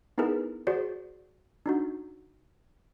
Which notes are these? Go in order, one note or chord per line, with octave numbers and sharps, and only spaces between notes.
B3 D#4 E4 G#4 A#4 B4
F#4 G#4 C5 D5
D4 D#4 F#4